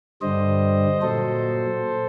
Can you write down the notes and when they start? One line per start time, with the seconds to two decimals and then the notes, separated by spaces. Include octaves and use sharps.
0.21 G2 D3 G3 C5 D#5
1.02 A#2 F#3 A4 C5